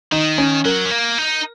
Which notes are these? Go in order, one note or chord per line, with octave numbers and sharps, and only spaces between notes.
D#3 D#4
C#4
F#3 A#4
C#4
A#3
D#4